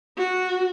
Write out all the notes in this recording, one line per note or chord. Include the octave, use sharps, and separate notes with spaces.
F#4